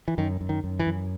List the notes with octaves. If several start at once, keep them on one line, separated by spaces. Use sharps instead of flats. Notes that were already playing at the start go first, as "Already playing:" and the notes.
E3
F#2 D#3
F#2
D#3
F#2
E3
F#2